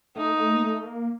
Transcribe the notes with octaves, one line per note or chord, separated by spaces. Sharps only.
A3 D#4
A#3
A3
A#3
A3
A#3